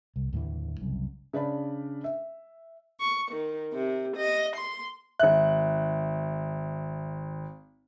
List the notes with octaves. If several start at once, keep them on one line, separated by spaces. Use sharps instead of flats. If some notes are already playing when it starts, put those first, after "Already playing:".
C2
D#2 A2 D3 E3
F#1 C2 F#2
C#3 D4 D5 B5
E5
C#6
D#3
C3
D#5
C6
G#1 E5 F#6